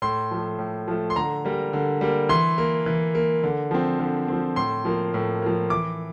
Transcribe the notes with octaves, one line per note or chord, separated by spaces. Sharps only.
A2 C6
F3 A3
A2
F3 A3
C6
D3 A#5
G3 A#3
D3
G3 A#3
E3 C6
A#3
E3
A#3
D3
F3 C4
D3
F3 C4
A2 C6
F3 A#3
A2
F3 A#3
E3 D6